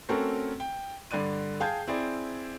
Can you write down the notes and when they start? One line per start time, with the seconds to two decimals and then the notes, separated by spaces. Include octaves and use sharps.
0.09 A3 C4 C#4 F#4 A4 A#4
0.60 G5
1.11 G2 D3 D5 F#6 D#7
1.60 G#4 F5 G5 A5 G6 G#6
1.87 C4 E4 G#4 D5